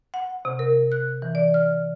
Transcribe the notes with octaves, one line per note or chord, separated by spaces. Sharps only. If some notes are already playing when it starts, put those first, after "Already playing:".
F#5
C3
A#4
F#6
E3
D5
F6